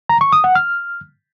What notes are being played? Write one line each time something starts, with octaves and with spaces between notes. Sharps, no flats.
A#5
C#6
D#6
F#5
F6